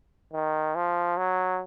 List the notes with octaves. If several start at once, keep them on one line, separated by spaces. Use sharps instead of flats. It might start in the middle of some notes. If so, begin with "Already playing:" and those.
D#3
F3
F#3